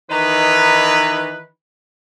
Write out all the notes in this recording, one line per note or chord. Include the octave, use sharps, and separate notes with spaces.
D#3 E3 D#4 B4